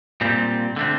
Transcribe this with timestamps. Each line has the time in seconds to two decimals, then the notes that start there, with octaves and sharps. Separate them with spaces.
0.21 A#2 G3 C4
0.76 D3 A3 C4